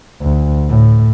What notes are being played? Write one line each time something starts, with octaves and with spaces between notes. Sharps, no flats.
D2
A2